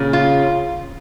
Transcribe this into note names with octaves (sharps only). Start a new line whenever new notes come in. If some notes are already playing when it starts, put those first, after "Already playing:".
Already playing: A#2 C#3
F4